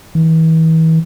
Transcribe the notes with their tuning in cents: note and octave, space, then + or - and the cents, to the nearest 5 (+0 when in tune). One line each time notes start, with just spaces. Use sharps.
E3 -40